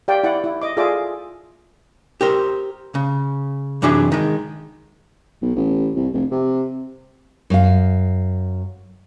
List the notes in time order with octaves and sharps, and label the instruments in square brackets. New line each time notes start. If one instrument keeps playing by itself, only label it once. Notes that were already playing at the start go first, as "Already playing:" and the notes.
[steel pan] G4 D5 F5 G5
E4 D5 F#5
E4
D#5 D6
F4 G#4 A4 D5 E5 D6
[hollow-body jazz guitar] G4 A#4 C5
C#3
F#2 C3 E3 D4 G#4 E5
D#3 G#3
[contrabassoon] B1
A1
C2
F1
C3
[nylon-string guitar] F#2 F5